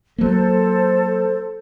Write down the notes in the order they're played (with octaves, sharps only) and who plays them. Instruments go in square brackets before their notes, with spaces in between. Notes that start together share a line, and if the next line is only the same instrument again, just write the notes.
[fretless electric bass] F#3 A#3 [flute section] A4 C5